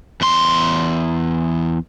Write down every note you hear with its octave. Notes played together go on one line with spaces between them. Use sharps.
E2 C6